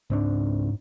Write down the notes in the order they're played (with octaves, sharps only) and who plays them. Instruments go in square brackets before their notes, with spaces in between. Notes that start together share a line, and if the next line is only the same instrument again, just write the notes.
[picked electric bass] C#2 C4 D4 [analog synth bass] G#2